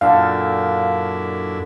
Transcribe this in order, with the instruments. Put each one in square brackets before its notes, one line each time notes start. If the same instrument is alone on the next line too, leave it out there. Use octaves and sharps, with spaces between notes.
[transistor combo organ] F#2 D4 E4 [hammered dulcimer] A#2 D3 A4 [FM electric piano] F5